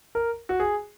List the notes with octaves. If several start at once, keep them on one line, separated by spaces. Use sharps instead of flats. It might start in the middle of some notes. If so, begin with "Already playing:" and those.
A#4
F#4
G#4